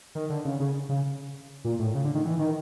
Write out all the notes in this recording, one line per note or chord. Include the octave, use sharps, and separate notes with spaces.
D#3
D3
C#3
C#3
C#3
A#2
A2
C#3
D3
D#3
E3
D#3